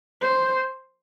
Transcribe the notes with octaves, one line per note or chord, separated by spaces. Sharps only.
C5